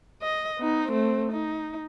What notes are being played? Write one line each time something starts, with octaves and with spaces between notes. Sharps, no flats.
D#5
B3 D#4
A3 C4
D#4